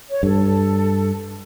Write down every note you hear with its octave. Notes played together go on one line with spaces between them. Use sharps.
C#5
G2 A4